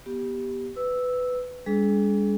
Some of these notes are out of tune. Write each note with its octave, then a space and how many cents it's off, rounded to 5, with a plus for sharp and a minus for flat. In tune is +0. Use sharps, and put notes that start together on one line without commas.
B3 -20 G4 +0
B4 +15 E6 -5
G#3 -45 D4 -40 G#4 +35